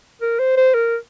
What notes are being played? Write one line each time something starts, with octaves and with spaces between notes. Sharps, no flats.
A#4
C5
C5
A#4